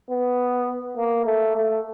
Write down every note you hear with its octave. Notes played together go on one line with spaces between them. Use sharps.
B3
A#3
A3
A3